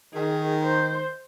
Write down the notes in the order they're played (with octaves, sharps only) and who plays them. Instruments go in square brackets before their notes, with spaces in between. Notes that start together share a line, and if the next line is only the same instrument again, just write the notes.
[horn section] D#3 [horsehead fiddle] G#4
[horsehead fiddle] C5